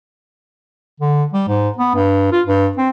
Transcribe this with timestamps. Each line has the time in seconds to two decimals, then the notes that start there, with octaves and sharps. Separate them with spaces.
1.00 D3
1.33 G3
1.48 G#2
1.78 B3
1.95 G2
2.32 F4
2.46 G2
2.77 C4